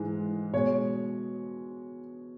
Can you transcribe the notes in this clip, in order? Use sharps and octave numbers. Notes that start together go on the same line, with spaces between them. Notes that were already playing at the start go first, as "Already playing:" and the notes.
Already playing: G#2 E3 G#3
B2 G#3 C#5